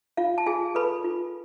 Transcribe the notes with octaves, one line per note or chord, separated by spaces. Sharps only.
F4 F5
A5
F4 G#4 G#5
A4 B4 B5
F4